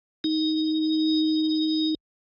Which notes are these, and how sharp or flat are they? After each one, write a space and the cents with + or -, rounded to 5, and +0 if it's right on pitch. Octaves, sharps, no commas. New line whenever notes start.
D#4 +10